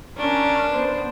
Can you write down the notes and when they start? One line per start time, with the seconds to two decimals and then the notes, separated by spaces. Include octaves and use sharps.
0.18 C#4 D4 A#4
0.71 B3 C5